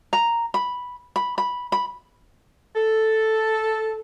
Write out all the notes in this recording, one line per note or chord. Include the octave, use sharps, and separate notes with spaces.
A#5
B5
B5
B5
B5
A4